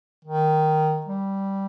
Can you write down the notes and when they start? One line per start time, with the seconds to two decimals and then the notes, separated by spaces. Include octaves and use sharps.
0.25 D#3
1.06 G3